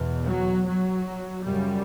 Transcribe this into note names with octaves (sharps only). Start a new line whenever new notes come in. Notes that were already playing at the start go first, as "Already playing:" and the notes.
Already playing: E2 B2
F#3
F#3
F#2 C#3 G3